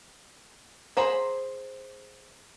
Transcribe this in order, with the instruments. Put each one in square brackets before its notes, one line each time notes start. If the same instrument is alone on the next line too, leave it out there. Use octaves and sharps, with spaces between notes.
[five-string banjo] G#4 C5 A#5 B5